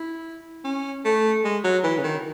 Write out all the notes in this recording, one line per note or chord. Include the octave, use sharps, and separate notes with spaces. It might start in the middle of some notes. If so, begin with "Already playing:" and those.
Already playing: E4
C#4
A3
G#3
F#3
E3
C#3
D#3